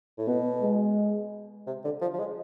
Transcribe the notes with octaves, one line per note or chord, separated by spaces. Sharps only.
A2
B2 B3
G#3
C3
D3
F3
F3
G#3